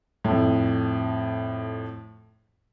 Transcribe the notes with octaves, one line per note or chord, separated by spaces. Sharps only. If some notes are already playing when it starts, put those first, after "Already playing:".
F2 A2